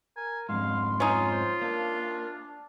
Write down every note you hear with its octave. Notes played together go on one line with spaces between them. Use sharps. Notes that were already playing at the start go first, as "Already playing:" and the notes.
A#4 G#5
F2 G#2 F5 C6
C#4 D#4 F4
C5
A#3 D4